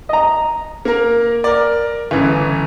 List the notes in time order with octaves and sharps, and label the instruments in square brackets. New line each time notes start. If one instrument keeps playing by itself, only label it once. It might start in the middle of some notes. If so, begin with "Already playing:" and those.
[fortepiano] D#5 A#5
[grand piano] A#3 A#4
A#4 D5
[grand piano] G1 E3 [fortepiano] C#3